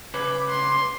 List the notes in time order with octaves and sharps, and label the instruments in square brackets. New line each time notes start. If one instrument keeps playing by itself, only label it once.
[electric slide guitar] C#3 B4 C#5 [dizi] D6
[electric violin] C6